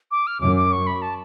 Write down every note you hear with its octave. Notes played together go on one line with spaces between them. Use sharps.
D6
F6
F#2 D6
D6
C#6
B5
A5